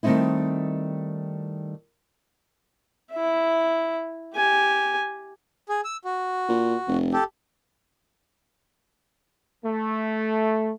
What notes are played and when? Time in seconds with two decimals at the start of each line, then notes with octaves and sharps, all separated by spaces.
0.03 D#3 G3 A3 C4 D#4 E4
3.13 E4 E5
4.35 G4 G#5
5.69 G#4
5.84 E6
6.05 F#4
6.48 A#2
6.87 F1
7.13 G4 A4
9.64 A3